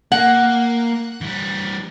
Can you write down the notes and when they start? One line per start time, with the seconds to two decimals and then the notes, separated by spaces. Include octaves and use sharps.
0.12 A#3 F#5
1.21 E3 G3